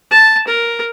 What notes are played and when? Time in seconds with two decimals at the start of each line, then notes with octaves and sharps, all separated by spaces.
0.11 A5
0.47 A#4